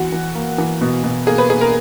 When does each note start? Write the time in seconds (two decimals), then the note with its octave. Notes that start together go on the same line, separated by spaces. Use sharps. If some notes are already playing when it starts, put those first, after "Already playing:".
Already playing: E3 B3 F#4
0.12 E3
0.35 A#3
0.58 E3
0.81 B2
1.04 B2
1.27 A#3 G#4
1.38 B4
1.50 A#3 G#4
1.61 A#4